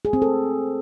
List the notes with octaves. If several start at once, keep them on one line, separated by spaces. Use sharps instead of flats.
G#4
C4
A4